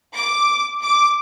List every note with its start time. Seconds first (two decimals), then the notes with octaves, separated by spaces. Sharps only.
0.15 D6
0.82 D6